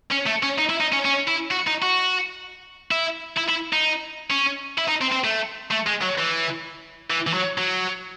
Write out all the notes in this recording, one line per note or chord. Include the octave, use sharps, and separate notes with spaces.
C#4
A3
C#4
D#4
E4
D#4
C#4
C#4
E4
F#4
D#4
F#4
E4
E4
E4
D#4
C#4
E4
D#4
C4
C4
A3
A3
G#3
F#3
E3
E3
E3
F#3
F#3